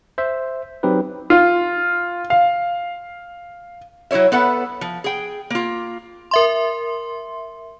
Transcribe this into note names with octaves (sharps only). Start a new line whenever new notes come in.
C5 E5
F#3 C4 D#4 G4 B4
F4
F5
F#3 E4 A#4 C#5 E5
B3 A4 B4 E5 F#5
F3
G#4 G5
A#3 F4
A#4 E5 C6